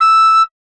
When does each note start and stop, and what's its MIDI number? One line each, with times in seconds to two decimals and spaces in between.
0.01 0.43 88